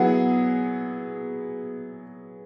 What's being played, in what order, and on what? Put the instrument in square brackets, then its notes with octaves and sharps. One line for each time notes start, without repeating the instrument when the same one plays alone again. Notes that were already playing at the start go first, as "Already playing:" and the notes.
Already playing: [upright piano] F#3 B3 E4 G#4 [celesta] F#5